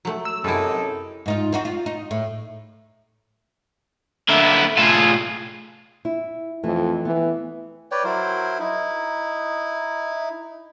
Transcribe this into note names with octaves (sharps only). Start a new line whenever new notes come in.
F#3 A3
E6
F#2 C3 D#4 E4 G#4 A4
G#2 D#4 F4
C4 D#4 F#4
F4
D#4
A2
D3 A#3 B3 E4
A2 F4 G#4 A4
E4
F2 E3 A3
E3 B3
B4 C#5 D5 G5
F#3 E4 A#4 C5
D#4 E4